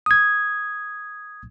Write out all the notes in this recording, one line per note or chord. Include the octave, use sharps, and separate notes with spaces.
D#6 G#6